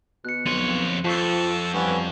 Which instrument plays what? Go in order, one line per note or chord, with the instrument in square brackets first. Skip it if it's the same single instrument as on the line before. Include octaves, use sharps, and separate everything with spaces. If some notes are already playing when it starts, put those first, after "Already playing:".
[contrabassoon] B2 [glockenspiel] F#6 C#7
[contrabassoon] B1 [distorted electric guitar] F2 C#5 [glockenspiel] C6 D#7 F#7
[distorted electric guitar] F2 [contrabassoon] F3 [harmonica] A4 [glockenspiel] A5 C#6
[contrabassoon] G2 [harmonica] E3 B3 C#4